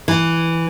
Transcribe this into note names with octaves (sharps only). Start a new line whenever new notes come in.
E3